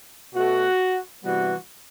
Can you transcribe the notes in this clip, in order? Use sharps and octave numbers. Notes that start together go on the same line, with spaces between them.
B2 A3 F#4
C3 E3 G3 B3 F#4